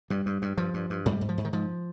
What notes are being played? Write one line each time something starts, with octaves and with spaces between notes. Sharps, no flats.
G2 G3
G2
G2
G2 F3
G2
G2
G#2 G3
G#2
F3
G#2
D#3
G#2 F3